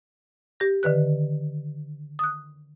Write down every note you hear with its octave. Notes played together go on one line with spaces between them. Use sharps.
G4 A#6
D3 D#3 B4 F#6
D#6 F#6